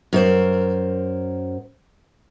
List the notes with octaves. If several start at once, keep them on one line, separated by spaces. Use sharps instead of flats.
F#2 A#4 C5